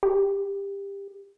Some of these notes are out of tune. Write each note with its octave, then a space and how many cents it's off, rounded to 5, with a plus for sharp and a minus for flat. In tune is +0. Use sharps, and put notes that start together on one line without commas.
G4 +20